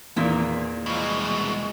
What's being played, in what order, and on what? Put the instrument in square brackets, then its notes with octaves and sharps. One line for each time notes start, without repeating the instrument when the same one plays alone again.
[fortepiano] E2 A#2 [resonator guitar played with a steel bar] D#3 E3 A#3
[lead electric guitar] C2 B2 [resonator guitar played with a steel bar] E3 F3 [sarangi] G#3